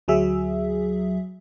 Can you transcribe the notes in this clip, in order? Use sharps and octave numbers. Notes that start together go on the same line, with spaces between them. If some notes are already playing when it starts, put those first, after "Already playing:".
D2 F#3 G#4 E5